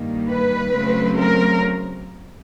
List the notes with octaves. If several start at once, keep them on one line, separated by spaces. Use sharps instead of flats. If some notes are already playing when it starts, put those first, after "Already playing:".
Already playing: G2 D#3 G3 A#3
B4
C#3 F#3 A3 C4
A#4